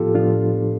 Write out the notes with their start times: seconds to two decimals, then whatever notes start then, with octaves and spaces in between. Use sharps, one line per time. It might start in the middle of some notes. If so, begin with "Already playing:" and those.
Already playing: A2 F3 B3 F4 G4 A4
0.14 A2 F3 B3 D4 F4